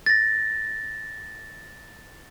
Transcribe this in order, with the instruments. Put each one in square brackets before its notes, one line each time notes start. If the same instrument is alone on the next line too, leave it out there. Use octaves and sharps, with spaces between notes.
[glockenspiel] A6 A#6